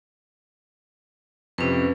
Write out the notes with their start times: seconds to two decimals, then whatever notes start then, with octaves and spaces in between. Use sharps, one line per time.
1.58 F2 C3 C#4 B4